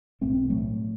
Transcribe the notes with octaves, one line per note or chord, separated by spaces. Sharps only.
B1 A2 A3 C4
F#3 A3